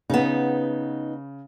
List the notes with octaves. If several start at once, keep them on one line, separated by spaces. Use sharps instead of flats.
C#3 B3 D#4